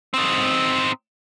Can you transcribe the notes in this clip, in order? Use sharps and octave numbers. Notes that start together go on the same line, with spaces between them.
C4 D#4